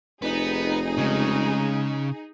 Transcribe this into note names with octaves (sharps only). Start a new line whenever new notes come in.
F1 B3 D#4 G#4
C#3 G#3